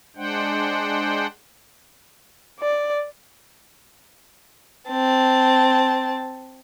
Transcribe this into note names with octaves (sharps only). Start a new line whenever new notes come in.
G#3 D4 C5 F#5 G5
D5
C4 A5